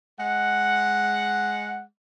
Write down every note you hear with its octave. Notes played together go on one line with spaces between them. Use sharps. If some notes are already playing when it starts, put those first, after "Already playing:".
G#3 F#5